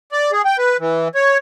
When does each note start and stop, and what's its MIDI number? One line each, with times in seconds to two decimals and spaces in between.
0.12 0.31 74
0.32 0.42 68
0.45 0.57 79
0.59 0.77 71
0.80 1.08 52
1.15 1.38 73